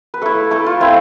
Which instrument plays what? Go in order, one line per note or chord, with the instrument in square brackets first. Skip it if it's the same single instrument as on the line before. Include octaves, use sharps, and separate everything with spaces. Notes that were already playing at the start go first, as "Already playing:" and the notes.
[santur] B4
A3 E4 A4
A3 E4 A4
F4
A3 C4 E4